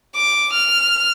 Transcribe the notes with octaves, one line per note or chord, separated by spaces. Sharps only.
D6
F6